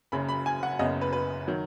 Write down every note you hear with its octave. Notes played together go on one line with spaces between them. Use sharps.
F#1 F#2 C#3 B5
B5
G#5
F#5
F#1 F#2 C#3 B3 D#5
B4
B4
D#3 F#3